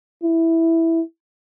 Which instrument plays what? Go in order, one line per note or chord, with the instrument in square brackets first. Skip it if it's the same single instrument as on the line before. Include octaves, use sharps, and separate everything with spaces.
[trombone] E4